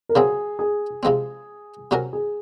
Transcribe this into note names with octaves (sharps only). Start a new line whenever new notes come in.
A#4
C#3 F#3 C4 G#4
G#4
C3 F3 G#3 C4
C3 F#3 C#4 F#4 A#4
G#4